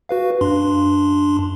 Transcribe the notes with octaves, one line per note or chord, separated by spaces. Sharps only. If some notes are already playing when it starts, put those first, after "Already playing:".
F#4 B4 F5
F#2 D4 C6